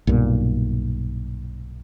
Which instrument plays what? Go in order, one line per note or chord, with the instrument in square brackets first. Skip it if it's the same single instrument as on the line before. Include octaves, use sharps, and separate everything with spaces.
[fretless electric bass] B1 G2 A#2